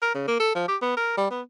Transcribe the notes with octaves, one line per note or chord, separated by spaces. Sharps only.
A#4
C#3
A#3
A4
F3
G4
B3
A#4
G3
B3